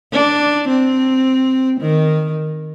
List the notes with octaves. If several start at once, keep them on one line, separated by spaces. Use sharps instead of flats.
D4
C4
D#3